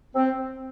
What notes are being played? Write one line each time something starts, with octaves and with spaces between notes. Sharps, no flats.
C4